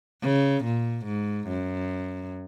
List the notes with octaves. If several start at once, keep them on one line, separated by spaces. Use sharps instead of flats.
C#3
A#2
G#2
F#2